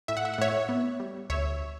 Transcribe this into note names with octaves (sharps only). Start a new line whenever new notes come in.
A2 E5
F#5
E5
F#5
A2 C#5 E5
B3
G3
D2 C#5 E5